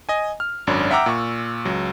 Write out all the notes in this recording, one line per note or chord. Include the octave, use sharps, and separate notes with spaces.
D#5 G#5
F6
G#1 F#2 D4 C#5 B5
E5 F#5 G5 A#5 D6 E6
A#2 C#6
C#2 F#3